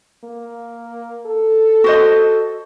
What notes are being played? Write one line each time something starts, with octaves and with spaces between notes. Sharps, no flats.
A#3
A4
F#4 C5 D#5